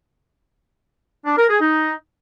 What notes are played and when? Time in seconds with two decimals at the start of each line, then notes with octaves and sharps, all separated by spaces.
1.26 D4
1.38 A#4
1.49 G#4
1.61 D#4